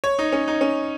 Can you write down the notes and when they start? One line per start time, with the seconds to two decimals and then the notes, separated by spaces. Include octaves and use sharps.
0.04 C#5
0.19 D#4
0.32 C#4
0.48 D#4
0.61 C#4